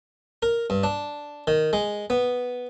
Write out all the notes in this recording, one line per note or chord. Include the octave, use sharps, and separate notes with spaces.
A#4
G2
D4
D#3
G#3
B3